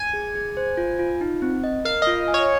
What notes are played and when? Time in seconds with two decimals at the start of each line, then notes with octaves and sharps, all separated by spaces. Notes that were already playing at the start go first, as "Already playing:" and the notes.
Already playing: G#5
0.13 G#4
0.35 G#4
0.57 C5
0.77 F4
0.99 F4
1.21 D#4
1.42 C4
1.64 D#5
1.85 A#4 F5
2.02 F4 D#5
2.28 G#5
2.34 C#5